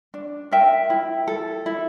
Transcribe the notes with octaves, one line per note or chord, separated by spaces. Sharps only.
D4
A#4 E5 G5
E4
A4
E4